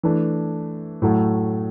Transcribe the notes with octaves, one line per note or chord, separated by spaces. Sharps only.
E3 A3 D4
A2 F#3 A3